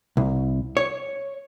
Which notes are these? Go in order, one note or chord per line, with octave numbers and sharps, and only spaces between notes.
C2
C#5